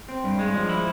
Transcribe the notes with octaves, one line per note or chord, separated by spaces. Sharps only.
C4
G2
G#3
F3
E4